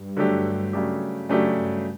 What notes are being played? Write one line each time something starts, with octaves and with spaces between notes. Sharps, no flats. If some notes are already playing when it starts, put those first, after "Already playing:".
Already playing: G2
D3 F#3 A3 D4 G4
C#3 F#3 A3 D4 G4
F#2 C#3 F#3 A3 D4 G4
G2